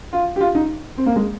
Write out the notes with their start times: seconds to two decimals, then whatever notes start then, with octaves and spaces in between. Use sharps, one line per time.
0.13 F4
0.36 G4
0.41 F4
0.55 D#4
0.98 C4
1.06 A#3
1.16 G#3